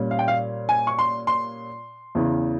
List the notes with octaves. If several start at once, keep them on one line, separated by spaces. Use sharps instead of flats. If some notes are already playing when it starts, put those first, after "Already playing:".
Already playing: A#2 G3 C#4
F5
G5
F5
G#5
C#6
C6
C6
E2 C#3 E3